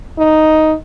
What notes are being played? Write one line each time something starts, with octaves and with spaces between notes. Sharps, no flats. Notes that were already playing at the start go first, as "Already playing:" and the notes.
D#4